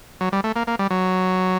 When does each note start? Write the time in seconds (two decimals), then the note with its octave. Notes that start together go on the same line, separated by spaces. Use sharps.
0.21 F#3
0.32 G3
0.44 A3
0.56 A#3
0.67 A#3
0.79 G3
0.90 F#3